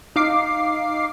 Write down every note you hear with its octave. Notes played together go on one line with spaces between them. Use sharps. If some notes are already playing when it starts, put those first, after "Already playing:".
D#4 F5 D6 C7